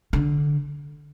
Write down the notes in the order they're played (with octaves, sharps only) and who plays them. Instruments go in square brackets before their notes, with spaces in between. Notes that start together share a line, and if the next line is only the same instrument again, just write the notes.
[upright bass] D3